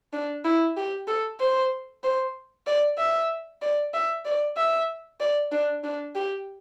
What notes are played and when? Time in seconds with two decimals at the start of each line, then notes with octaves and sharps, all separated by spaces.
0.13 D4
0.45 E4
0.77 G4
1.08 A4
1.40 C5
2.04 C5
2.67 D5
2.98 E5
3.62 D5
3.94 E5
4.25 D5
4.57 E5
5.20 D5
5.52 D4
5.84 D4
6.15 G4